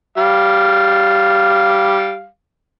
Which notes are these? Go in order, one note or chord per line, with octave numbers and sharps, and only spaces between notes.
G3 F5